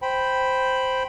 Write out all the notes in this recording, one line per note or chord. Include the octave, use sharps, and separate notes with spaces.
C5 G5 B5